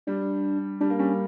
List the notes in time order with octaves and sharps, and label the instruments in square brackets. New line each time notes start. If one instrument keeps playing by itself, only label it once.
[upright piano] G3 [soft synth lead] D4
[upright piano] G3 [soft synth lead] D4
[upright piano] A#3
[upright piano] G3 [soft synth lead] C#4